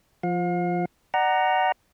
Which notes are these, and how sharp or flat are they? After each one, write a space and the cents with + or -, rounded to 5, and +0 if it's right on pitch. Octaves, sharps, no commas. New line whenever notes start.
F3 +0 F5 +40
D5 +35 F#5 +15 A#5 +0